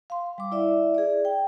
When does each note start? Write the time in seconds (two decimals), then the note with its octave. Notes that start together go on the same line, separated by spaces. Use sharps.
0.10 F5 C6
0.38 G3 D6
0.52 E4 D5 E5
0.95 G#4 D5
1.25 G5